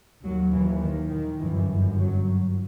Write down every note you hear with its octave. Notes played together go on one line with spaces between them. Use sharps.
D#2 F#3
E3
D#3
D#3
G1 F#2 E3
F#3